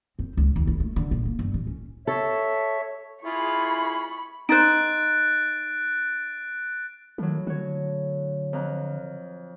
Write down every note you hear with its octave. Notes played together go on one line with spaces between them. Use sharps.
C4
C#2
D#2
E4
A3
D3
A#1
A#3
G1
A1
C#4
A4 C#5 E5
E4 F4 G#4 B5 C#6
D#4 C5 F#6 A6 D7
A2 D#3 F#3
D3 F#4 C#5
F2 A#5 F#6